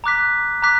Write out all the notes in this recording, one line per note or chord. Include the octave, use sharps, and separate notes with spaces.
A#5 D6 F#6 B6
A#5 D6 F#6 B6